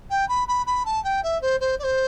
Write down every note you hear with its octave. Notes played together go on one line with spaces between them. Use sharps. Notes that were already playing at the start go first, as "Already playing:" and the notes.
G5
B5
B5
B5
A5
G5
E5
C5
C5
D5
C5